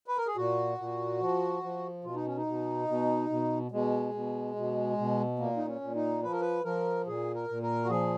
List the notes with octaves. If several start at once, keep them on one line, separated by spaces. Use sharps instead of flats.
B4
A#4
G#4
A#2 F#4
A#2
F3
F3
B2 F4
D#4
C#4
D#4
B2
B2
B2
B2 G#3
B2
B2
B2
A#2 A#3
D#4
C#4
A#2
D#4
F3 B4
A#4
B4
F3 A#4
A#2 G#4
A#4
A#2
A#4
F#4
F3 G#4